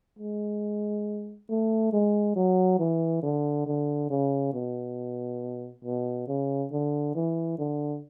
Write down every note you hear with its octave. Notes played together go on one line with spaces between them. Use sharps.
G#3
A3
G#3
F#3
E3
D3
D3
C#3
B2
B2
C#3
D3
E3
D3